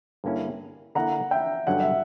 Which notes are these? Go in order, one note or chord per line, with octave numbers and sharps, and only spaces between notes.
G2 D3 A#3 C#4 E4
D3 A#3 E4 F#5 A#5
E5 G5
G2 D3 F#3 C#4 F#5
E5